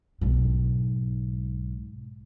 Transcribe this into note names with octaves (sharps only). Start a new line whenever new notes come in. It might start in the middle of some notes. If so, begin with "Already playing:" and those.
B1 G#2